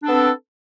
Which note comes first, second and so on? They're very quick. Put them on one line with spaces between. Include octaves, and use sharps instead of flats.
D4 A4 B3 C4